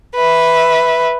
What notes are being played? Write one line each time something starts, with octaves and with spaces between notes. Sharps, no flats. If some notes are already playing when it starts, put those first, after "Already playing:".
B4 E5